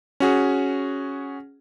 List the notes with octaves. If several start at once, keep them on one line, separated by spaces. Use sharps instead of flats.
C#4 F#4 G#4